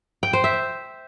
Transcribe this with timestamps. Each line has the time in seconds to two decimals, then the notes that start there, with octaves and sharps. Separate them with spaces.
0.23 G5
0.33 C5
0.44 E5